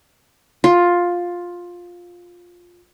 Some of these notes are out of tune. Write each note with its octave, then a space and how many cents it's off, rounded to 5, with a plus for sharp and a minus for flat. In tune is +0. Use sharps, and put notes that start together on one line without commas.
F4 +10